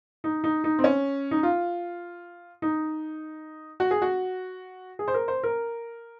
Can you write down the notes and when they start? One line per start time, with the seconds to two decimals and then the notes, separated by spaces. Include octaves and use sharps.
0.24 D#4
0.44 D#4
0.64 D#4
0.79 C4
0.84 C#4
1.31 D#4
1.43 F4
2.62 D#4
3.80 F#4
3.91 G#4
4.02 F#4
4.99 G#4
5.08 C5
5.14 A#4
5.28 C5
5.43 A#4